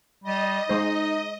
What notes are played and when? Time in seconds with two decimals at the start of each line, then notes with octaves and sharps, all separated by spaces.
0.24 G3 D#5
0.70 G#3 D#4 C5